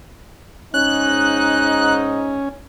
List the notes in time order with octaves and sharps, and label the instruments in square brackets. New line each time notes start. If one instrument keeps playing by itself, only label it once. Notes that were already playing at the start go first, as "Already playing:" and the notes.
[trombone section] G#2 D#4 [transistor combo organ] C#4 [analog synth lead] F#6